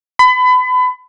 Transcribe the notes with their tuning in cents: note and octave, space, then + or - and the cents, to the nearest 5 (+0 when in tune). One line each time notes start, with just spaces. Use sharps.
B5 +30